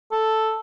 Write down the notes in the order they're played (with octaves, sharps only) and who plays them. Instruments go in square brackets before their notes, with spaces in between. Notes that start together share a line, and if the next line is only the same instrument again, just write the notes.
[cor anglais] A4